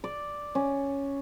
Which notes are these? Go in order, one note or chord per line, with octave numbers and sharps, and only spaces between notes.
D5
C#4